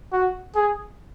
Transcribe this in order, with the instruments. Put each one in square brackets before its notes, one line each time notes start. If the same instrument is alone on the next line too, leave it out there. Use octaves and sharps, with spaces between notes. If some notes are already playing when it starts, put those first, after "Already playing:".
[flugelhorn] F#4
G#4